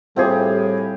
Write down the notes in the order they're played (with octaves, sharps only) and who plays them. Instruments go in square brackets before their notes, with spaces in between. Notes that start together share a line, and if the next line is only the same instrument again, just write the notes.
[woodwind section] A2 [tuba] G3 [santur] C4 G4 G#4 [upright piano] F4 C5